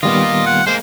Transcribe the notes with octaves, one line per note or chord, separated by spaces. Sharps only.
D#3 G3 A#3 B3 F4 D#5
F#5
G#3 A#3 C5